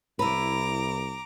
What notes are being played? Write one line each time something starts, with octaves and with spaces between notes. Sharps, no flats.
C2 E4 B4 A#5 D6